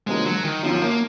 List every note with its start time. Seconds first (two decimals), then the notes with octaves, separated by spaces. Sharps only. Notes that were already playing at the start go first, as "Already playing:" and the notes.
0.07 E1 D#2 D3 F3 G#3 A#3
0.26 F#3
0.44 D#3
0.62 G1 F#2 D#3 F3 F#3
0.82 A#3